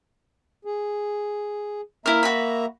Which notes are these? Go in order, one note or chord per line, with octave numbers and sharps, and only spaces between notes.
G#4
A#3 E4 A#4 E5 A#5
F#4 B5